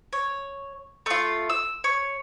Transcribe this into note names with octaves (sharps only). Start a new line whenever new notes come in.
C#5
A3 F4
E6
C#5